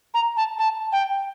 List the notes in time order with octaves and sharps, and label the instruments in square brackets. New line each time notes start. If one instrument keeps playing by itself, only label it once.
[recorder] A#5
A5
A5
G5